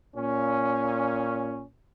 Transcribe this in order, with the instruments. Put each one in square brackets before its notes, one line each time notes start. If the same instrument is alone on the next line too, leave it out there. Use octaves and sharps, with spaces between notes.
[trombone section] A#2 C#4